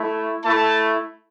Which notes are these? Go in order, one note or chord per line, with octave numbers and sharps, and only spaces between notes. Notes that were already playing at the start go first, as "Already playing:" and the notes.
Already playing: A3 E4
A3 E4 A5